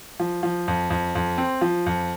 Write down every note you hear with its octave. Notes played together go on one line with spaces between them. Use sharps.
F3
F3
F2
F2
F2
C4
F3
F2